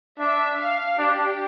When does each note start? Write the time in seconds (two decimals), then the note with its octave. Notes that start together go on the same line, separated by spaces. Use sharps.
0.19 D4 E5
0.59 F5
0.98 D4 G4